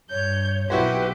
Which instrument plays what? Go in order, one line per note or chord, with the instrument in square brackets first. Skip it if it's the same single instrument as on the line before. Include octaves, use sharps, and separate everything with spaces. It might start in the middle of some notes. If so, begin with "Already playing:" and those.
[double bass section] G2 [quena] C#5 [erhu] G6
[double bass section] B1 [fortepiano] E4 F#4 C5 [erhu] G4 [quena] B4